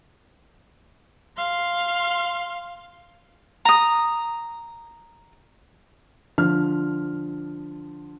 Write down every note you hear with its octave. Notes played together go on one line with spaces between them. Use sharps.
F5 C6
A#5 D#6
D3 F3 F6